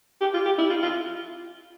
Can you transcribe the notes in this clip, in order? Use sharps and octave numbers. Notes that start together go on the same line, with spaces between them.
G4
F4
G4
E4
F4
F4